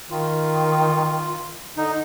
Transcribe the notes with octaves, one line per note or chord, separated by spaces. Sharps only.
D#3 F4
D3 D#4